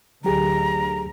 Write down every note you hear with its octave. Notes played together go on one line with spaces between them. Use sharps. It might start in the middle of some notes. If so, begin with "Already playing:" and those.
A1 D2 D3 F#3 G4 G#4 A#5